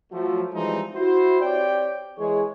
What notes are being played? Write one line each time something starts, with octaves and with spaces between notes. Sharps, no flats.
F3 F#3 A3
E3 F3 G3 G#3 C4 D#4
E4 F#4 C5
C4 G4 C#5 D5 G5
E3 G#3 G#4 C#5